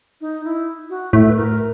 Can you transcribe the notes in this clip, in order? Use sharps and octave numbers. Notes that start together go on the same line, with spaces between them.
D#4
E4
F#4
A2 A4
B4
A#4